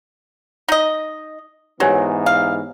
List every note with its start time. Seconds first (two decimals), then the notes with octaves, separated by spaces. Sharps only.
0.68 D#4 D#5
1.80 G#2 E3 F#3 B3 G4 C#5 G#5
2.26 F5